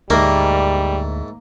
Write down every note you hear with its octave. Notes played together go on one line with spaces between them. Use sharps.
D2 G#2 G3 A3 A#3